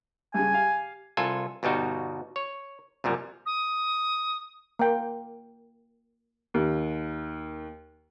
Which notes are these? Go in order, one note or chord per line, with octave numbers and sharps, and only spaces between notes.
G2 C#3 G#5
G4 F5
C2 F4 A4 G#5
G1 B2 G3 D#4 F#4
C#5
C2 F#2 A#2 G3
D#6
A#3 G5
D#2